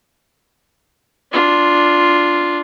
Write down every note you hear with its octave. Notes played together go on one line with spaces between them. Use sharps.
D4 F4